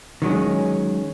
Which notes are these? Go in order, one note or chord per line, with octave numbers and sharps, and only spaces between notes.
D#3 F#3 G#3 C#4